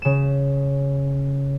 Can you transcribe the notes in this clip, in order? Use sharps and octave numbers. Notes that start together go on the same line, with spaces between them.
C#3 E7